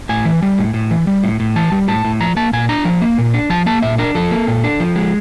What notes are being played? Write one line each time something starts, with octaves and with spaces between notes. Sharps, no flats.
A2 G#5
E3
G3
A2
A2
E3
G3
A2
A2
E3 A5
G3
A2 A5
A2
F3 A#5
A#3 A5
A#2 G#5
D4 A#5
F3
A#3
A#2
D4
F3 A5
A#3 A5
A#2 E5
D4 A#4
F3 A4
A#3
A#2
D4
F3
G#3